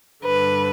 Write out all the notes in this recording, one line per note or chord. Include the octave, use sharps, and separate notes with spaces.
G2 D3 B4